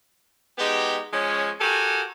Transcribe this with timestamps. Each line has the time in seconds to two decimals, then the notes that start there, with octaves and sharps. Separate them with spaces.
0.59 G#3 B3 D#4 G4
1.13 F3 G#3 C#4
1.61 F#4 G4 A4 A#4 G#5